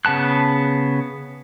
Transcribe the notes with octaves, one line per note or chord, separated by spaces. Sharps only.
C#3 B3 A5 F#6